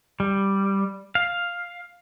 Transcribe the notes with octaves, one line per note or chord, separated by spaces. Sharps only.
G3
F5